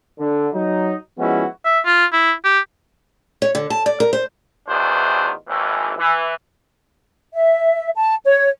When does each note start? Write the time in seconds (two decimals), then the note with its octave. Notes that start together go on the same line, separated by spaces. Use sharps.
0.19 D3
0.53 F#3 D#4
1.18 F3 G#3 B3 C#4 E4 F#4
1.65 E5
1.86 F4
2.12 E4
2.45 G4
3.42 C#5
3.55 D3
3.70 A5
3.86 D5
4.00 A#4
4.13 C5
4.68 A1 E2 D#3 D4 F#4 C5
5.48 G#1 D#2 E3
5.97 E3
7.34 E5
7.96 A5
8.25 C#5